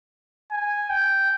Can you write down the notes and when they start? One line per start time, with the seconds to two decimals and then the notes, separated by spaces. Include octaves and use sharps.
0.51 G#5
0.90 G5